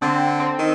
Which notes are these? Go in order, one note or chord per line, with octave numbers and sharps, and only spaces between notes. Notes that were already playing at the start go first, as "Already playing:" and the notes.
D3 C4
C4
D#3